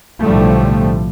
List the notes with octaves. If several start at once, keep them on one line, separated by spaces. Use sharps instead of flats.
B1 A2 D3 F3 G3 A3